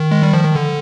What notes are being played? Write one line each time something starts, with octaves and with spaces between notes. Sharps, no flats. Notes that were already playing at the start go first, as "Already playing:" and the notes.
Already playing: D#3
G#3
G3
F3
D#3
D3